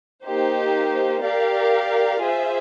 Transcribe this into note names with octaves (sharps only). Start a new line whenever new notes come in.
A#3 D#4 G4 C5
G4 A#4 D5 F5
F4 G#4 C5 E5